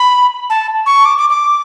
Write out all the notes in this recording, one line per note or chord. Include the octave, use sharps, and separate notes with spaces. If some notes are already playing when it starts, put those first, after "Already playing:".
Already playing: B5
A5
C#6
D6
D6
D6